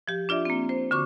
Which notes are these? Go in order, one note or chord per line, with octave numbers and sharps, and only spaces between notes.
F3 G4
D4 F4 D5 E5
A#3 C4
C5
D3 F#4 C#6 D6